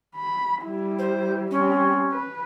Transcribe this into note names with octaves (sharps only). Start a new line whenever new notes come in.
B5
G3 E4
C5
G3 C4 C#4
B4